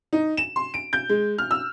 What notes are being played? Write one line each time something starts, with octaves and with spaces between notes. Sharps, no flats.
D#4
E7
C6
D7
G6
G#3
F6
E6